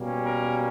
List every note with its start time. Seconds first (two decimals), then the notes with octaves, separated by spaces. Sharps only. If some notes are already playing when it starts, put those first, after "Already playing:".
Already playing: B2 G3 A#3 C#4
0.26 A#4